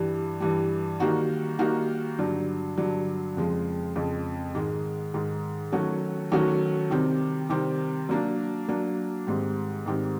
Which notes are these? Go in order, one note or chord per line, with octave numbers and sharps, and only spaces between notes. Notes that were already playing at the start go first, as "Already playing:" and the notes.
Already playing: G2 E3 G3
G2 E3 G3
D#3 G3 A#3 D#4 F#4
D#3 G3 A#3 D#4 F#4
G2 D3 F#3
G2 D3 F#3
F2 C#3 F3 G#3
F2 C#3 F3 G#3
G#2 D#3 G#3
G#2 D#3 G#3
D#3 F#3 A3 C#4 F#4
D#3 F#3 A3 C#4 F#4
C3 D#3 G3 C4
C3 D#3 G3 C4
F#3 A#3 D4
F#3 A#3 D4
G#2 D#3 G3 C4
G#2 D#3 G3 C4